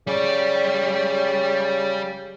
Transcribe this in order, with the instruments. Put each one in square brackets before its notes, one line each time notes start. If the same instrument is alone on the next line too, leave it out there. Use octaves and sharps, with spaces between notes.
[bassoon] C#3 [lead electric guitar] G3 D5